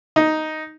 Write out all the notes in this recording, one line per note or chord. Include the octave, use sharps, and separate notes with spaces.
D#4